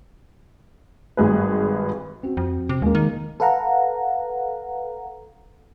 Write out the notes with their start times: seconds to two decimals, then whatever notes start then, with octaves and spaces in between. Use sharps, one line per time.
1.17 G#1 G2 G#4 B4
2.23 C4 F#4
2.37 F2
2.69 C3
2.82 D#2 G#3 A#3
2.95 D#3
3.40 A4 B4 F5 F#5 A#5